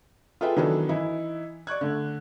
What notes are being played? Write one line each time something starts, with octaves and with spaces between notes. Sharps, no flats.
F4 G#4 A4 B4 E5 G5
D#3 E3 F#3 B3 D4 A4
E3 D#4 E4
D5 C#6 F#6 G#6
D3 A3